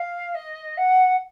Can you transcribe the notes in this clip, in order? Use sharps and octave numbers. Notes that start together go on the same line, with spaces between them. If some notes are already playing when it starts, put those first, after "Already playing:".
Already playing: F5
D#5
F#5